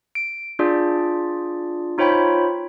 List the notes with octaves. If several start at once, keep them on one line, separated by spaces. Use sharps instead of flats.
D7
D4 F4 G#4 D5
D#4 F4 C5 C#5 G5 B5